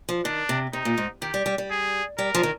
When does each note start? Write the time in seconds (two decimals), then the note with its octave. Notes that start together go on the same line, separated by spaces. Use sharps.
0.09 F3
0.25 D#3 D4
0.49 C3
0.73 C3 D#4
0.85 A#2
0.98 G#2
1.22 D#3 G4
1.34 G3
1.46 G3
1.58 G3
1.71 G#4
2.18 G3 A#4
2.35 F3
2.43 D#3